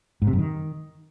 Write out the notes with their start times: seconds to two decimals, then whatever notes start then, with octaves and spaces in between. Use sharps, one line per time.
0.22 G#2
0.27 C3
0.33 F#2
0.39 D#3